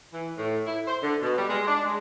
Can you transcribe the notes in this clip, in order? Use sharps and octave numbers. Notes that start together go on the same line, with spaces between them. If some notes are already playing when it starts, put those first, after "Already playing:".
E3
A2
E4
C5
D3
B2
G3
G#3
D4
G#3